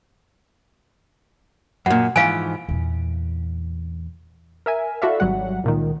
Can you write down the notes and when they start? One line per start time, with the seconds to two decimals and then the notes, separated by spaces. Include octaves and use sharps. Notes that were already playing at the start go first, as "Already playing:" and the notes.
1.86 F#2 A#2 F#5
2.16 G#2 E3 F3 F5 G#5
2.69 E2 A#2
4.66 A#4 E5 G#5
5.02 E4 F#4 A4 D5 E5 F5
5.20 G#1 F#3 G3 F#5
5.64 C#2 A#2 D#3